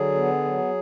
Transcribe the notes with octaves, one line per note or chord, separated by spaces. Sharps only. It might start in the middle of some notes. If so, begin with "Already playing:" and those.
Already playing: D3 F#3 G#4
B3
F#3